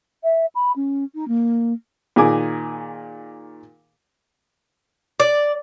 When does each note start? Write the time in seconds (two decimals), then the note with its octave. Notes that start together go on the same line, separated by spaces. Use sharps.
0.23 E5
0.55 B5
0.76 C#4
1.15 D#4
1.28 A#3
2.16 A#2 D#3 G#4 G#5 D6
5.20 D5